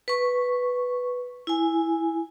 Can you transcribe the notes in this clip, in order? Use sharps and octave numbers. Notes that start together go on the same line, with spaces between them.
B4 C#6
E4 G#5